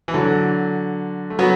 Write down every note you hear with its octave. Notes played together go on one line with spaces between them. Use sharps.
E3
D3 F#3
A3
F#3 B3